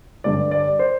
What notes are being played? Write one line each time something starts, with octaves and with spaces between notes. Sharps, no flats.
G2 D3 G3 D5
D5
C5